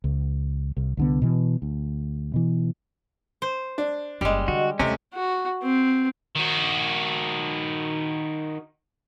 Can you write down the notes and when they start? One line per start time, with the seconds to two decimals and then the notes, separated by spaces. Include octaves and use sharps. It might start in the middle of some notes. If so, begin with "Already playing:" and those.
0.04 C#2
0.77 C2
0.97 C2 D3 B3
1.22 B2 E3
1.62 D2
2.34 B2 E3
3.42 C5
3.78 D4
4.21 F#1 G3 G#3
4.48 D3 F#4
4.79 D#2 C3 A3 C#4
5.15 F#4
5.62 C4
6.35 D#3 F#4